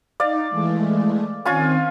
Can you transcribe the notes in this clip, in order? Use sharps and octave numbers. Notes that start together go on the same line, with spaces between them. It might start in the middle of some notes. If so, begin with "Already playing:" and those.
D#4 D5 F5
E3 G#3 A3
D#3 C4 C#4 F4 G#5